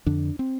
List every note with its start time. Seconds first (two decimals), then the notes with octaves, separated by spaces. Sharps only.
0.06 F2 D3 D4
0.39 C4